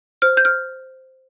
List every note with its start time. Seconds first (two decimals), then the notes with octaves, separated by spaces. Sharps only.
0.22 C5 F6
0.37 G6
0.45 F6